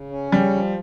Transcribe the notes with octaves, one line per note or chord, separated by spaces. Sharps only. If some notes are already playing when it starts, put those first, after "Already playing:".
Already playing: C#3
C#4
C#3 G3
F3